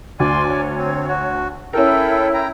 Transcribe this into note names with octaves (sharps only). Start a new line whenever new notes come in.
D2 D5 G#5 C6
C#5
C4
F#4
C#4 E4 A4 A#4 G5
G5 A#5